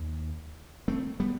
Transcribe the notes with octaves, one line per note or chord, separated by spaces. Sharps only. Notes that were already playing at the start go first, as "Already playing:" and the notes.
Already playing: D#2
A3 C4
G3 B3